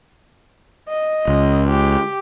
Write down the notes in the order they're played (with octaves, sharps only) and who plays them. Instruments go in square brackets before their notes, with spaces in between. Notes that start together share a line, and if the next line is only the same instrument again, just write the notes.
[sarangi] D#5
[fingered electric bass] C#2
[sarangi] G4